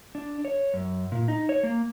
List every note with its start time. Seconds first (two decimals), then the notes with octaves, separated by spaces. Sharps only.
0.15 D4
0.45 C#5
0.74 F#2
1.12 A#2
1.28 D#4
1.49 C#5
1.63 A#3